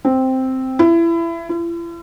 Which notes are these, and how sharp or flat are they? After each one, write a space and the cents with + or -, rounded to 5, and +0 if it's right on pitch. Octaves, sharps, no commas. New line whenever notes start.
C4 +0
E4 +25
E4 +45